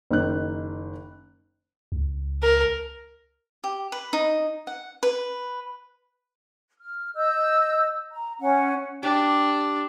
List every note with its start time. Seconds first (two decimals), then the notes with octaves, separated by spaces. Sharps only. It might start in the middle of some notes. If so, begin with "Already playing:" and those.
0.11 F#1 D#3 F#6
1.92 C#2
2.43 A#4
3.64 G4
3.92 B4
4.13 D#4
4.67 F#5
5.03 B4
6.79 F6
7.16 D#5 E6 G6
8.12 A#5
8.40 C#4 F#5
9.03 D4 G4